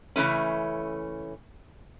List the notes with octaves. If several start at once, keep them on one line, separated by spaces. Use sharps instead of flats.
C#3 E3 A3 C#4